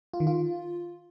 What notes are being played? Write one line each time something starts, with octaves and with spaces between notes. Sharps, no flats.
F4
D#3
F4